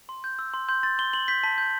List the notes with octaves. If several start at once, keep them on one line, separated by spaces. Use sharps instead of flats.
C6
G6
E6
C6
C6 G6
C6 A6
C6 G7
C6 F#7
G6 B6
A5 B6
G6